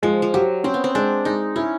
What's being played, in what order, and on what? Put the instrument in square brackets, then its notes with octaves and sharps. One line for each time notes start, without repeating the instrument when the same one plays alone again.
[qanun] F3 [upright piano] G#3
[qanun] F3
[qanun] F#3 [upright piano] G4
[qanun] C4 [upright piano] C#4
[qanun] B3
C4
[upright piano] G#3 [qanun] D4
[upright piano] G#3 [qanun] D#4
[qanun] C#4 [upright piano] E4